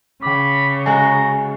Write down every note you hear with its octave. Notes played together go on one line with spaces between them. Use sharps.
C#3 G5 B5 D6
G#3 F#4 G#5 A#5